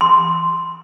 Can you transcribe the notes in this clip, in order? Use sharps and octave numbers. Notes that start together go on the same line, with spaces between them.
C6